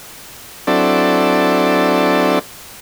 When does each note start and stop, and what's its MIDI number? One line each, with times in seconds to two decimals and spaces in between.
0.67 2.39 54
0.67 2.39 60
0.67 2.39 62
0.67 2.39 64
0.67 2.39 69
0.67 2.39 74